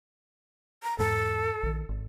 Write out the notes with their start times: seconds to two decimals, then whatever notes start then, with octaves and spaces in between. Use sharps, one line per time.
0.83 A#5
0.99 E2 G#2 A4
1.63 A#1 D#3
1.89 G#1